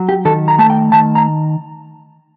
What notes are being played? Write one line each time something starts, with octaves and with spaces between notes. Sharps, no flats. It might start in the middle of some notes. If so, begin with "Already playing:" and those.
Already playing: F#3
G4
D#3 A4
A#5
A3 A5
G5
D#3 A5
A#5